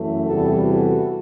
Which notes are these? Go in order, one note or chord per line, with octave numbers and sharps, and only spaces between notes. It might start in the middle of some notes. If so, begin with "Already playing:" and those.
Already playing: F#2 E3 A3
E2 C3 E3 G3 F#4 A4
F#4 A4